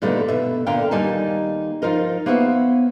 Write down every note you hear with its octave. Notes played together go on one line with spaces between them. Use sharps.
A#2 D3 G3 A3 B3 D#4
B2 E5
A#2 D3 A#4 F5 G5
D#2 G3 A#3 D#4 G#5 A5
F3 D#4 F4 A#4 D#5
A#3 B3 C5 C#5 E5